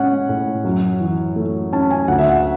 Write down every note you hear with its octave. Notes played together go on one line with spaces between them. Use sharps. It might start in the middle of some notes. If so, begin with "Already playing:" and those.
Already playing: A2 G#3 C#4 F#5
A2
F#2
E3
A3
C#4 A5
G#5
D2 F#5
E5
F#5